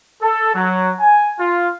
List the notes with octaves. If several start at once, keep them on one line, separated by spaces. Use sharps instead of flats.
A4
F#3
G#5
F4